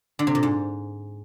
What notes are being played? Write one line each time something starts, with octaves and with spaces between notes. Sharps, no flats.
D3
C3
A#2
G#2